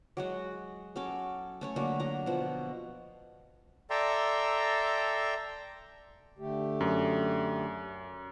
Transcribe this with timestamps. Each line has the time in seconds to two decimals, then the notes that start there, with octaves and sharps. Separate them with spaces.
0.17 F#3 G#3 F#4
0.96 F#3 C#4 A4 D6
1.61 A3 C#4 C#5
1.76 D3 F#3 A3 A#3
2.00 F#3 A#5
2.26 B2 F3
3.90 A4 D5 E5 G5 A#5 C6
6.39 D3 A3 G4
6.81 F#2